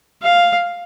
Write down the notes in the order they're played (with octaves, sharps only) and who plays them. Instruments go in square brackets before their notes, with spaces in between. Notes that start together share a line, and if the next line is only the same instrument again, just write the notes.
[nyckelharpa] F5